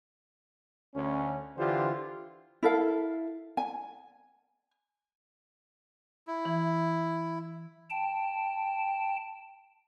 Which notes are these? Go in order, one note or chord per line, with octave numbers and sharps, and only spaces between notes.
D2 C#4
D3 E3 F4 G4 C5
E4 A4 A#4 F5
G#5
E4
E3
G5 A5